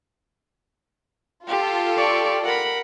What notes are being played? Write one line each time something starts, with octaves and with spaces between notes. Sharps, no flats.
F4 G4 A4
D5 C#6
A#4 F#5 B5